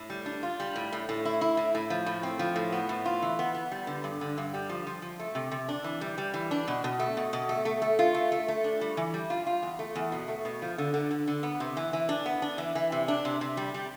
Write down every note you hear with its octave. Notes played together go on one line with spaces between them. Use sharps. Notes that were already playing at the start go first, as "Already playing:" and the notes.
Already playing: A2
G3
D4
F4
G3
A2
A2
A2
E4
E4
A2
A2
F3
A2
C4
F3
A2
B3
A2
F4
E3
B3
B3
G3
D3
G2
D3
G2
G3
F3
F3
F3
A3
C3
C3
D4
E3
G3
G3
E3
D4
B2
B2
A3
B2
B2
A3
A3
A3
F4
A3
A3
A3
D4
G3
E3
G3
F4
F4
E2
A3
E2
B2
A3
B2
F3
D3
D3
D3
D3
B3
C3
E3
E3
D4
B3
D4
E3
E3
C3
D4
C3
C3
G3
G3